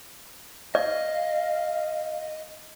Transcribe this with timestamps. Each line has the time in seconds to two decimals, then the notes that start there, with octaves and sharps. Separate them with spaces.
0.75 D5 D#5 F5